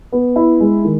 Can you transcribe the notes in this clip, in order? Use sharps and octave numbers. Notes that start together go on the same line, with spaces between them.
B3
E4
G#3
D#3